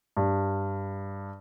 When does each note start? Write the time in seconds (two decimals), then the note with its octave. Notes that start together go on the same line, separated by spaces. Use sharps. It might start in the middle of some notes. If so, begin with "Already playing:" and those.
0.17 G2